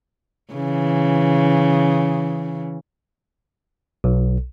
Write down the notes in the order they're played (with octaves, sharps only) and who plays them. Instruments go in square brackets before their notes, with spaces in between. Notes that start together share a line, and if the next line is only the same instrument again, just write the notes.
[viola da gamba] C#3 E3
[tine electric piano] B1